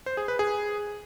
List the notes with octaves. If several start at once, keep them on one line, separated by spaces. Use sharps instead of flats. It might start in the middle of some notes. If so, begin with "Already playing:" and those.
C5
G#4
B4
G#4